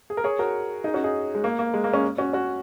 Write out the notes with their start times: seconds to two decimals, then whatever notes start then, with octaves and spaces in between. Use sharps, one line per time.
0.10 G#4
0.17 A#4
0.24 G#4 C#5
0.39 F#4 A#4
0.84 D#4 G#4
0.94 C#4 F#4
1.04 D#4 G#4
1.35 G#3
1.44 A#3
1.59 A#3
1.74 G#3
1.84 A#3
1.93 G#3 C#4
2.18 C#4 F#4
2.33 C#4 F#4